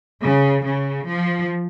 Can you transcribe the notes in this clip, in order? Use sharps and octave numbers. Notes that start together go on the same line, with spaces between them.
C#3
C#3
F3